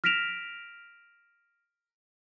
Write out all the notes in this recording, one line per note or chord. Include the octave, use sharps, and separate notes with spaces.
F6 A#6 B6 D7 E7 F7